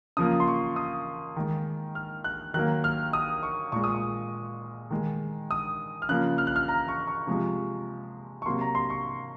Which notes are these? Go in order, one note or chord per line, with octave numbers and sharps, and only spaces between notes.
C#3 F3 A#3 D#6
C6
C#6
D#6
D#3 G#3
F6
F#6
D#3 F#3 A#3 F#6
F6
D#6
C#6
A#2 G#3 C#6
D#6
C#6
D#3 G#3
D#6
F6
C#3 F3 A#3 F#6
F6
F#6
F6
A#5
C#6
C#6
C3 F3 G#3
C#6
C3 F#3 A#3 C6
A#5
C6
C#6